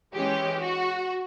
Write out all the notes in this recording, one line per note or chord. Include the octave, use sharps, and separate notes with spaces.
E3 G#3 C#4 G4
F#4